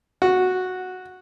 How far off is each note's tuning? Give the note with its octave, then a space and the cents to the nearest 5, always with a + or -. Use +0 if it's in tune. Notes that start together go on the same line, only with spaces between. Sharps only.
F#4 -5